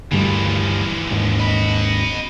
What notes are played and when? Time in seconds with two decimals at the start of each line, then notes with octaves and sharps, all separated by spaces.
0.12 D2 G2 E3 F3 G3
1.11 D#2 G#2
1.39 D#5 B5